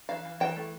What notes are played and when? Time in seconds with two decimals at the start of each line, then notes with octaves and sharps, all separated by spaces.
0.09 E3 F5
0.25 E3
0.40 E3 G5
0.56 A3